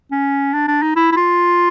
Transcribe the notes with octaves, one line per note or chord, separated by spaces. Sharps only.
C#4
D4
D4
D#4
E4
E4
F4